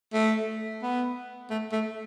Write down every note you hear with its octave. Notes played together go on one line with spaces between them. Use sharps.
A3
B3
A3
A3